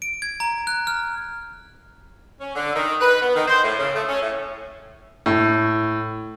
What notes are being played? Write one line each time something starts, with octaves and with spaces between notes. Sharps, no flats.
D7
G#6
A#5
F#6
F6
C#4
D3
D#3
B4
B3
D#3
C5
A2
C#3
A3
C#4
A2
A2